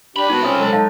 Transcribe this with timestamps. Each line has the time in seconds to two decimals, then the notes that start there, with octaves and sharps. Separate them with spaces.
0.16 C2 D4 G4 B5
0.30 B3 D#4 F#4
0.43 C4 C#4 F4 E5 D#6
0.55 F#3 G#3 A4
0.73 D#4 F5 A5